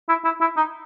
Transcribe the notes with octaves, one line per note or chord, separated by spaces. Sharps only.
E4
E4
E4
D#4